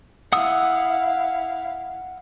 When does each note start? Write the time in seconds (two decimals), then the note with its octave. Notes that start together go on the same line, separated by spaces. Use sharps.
0.33 E4 F5 F#5 D#6 E6